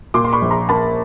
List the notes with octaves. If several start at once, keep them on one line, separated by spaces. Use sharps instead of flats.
A#2 C6 D6
C6
B5 C#6
A#1
A#5 C6
A#3 A5 B5